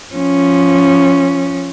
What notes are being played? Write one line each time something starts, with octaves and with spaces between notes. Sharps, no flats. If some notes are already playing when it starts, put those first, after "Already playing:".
F3 C#4